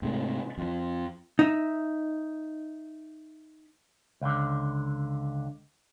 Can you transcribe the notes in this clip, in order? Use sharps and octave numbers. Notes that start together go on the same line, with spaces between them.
G#2 C3 A3
F2 F3
D#4 E5
C#2 D3